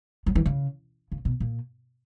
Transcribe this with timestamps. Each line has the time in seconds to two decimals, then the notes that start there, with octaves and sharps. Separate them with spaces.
0.26 F#3
0.35 E3
0.46 C#3
1.12 C#3
1.25 B2
1.40 A#2